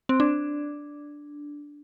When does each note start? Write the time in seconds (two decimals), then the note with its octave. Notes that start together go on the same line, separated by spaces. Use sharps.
0.09 C4
0.20 D4